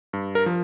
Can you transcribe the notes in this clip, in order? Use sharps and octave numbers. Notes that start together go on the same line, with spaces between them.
G2
A#4
F3